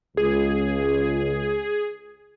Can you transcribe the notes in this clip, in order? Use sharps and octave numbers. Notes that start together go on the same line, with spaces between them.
C#2 G#4